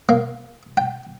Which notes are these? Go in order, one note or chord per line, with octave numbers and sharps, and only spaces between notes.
A#3
G5